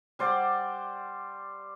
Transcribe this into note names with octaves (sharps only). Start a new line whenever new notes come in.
G3 C5 D5 F#5